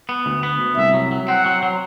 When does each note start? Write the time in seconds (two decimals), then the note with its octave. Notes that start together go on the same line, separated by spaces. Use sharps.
0.09 B3
0.26 D2
0.43 B3
0.60 D2
0.77 C2 E5
0.94 F#3
1.12 F#3
1.28 C4 F#5
1.46 F#3
1.63 F#3